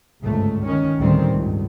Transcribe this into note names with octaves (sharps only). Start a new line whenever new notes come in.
G1 C#2 G#2 A3
D#3 C#4
A1 D2 A2 D#3 G3 C4
C#2 G2